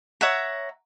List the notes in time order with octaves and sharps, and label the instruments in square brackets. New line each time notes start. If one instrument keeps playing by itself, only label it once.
[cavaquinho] C#5 E5 F#5 A#5